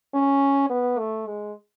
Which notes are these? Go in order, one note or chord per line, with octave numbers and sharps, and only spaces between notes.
C#4
B3
A3
G#3